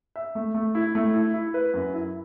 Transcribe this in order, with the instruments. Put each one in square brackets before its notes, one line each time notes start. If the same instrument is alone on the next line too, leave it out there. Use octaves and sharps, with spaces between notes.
[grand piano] E5
A3
A3
E4
A3
E4
E4
B4
F#2
E4